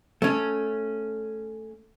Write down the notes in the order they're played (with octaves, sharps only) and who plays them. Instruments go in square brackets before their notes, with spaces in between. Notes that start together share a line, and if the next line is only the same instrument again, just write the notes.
[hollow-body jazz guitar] A3 C#4